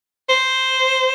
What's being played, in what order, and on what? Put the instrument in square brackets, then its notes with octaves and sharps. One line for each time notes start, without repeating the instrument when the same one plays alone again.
[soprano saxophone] C5